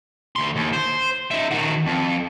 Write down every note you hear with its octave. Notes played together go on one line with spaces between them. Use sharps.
D2 C6
D#2
C5
D#4 E5
D#3 F#4
F2